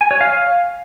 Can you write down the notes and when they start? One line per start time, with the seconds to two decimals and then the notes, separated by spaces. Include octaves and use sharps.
0.01 G#5
0.11 C#5
0.21 F5